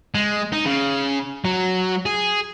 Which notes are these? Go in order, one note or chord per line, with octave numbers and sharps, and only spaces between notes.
G#3
D#4
C#3
F#3
G#4